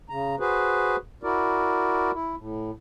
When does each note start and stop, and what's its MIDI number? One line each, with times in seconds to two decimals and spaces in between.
0.10 0.35 49
0.10 0.35 82
0.40 0.96 66
0.40 0.96 68
0.40 0.96 71
0.40 0.96 72
1.23 2.11 64
1.23 2.11 66
1.23 2.11 70
1.23 2.11 74
2.13 2.36 64
2.38 2.71 45